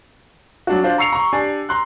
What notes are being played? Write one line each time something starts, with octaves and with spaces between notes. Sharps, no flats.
F#3 D4 F#4
D4 F4 C5
A#5 C#6 E6 C7 C#7 F7
A#5 C#6
D4 G4 D5 G#5
A#5 C6 F#6